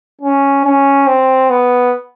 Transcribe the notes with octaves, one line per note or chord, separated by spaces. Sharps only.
C#4
C#4
C4
B3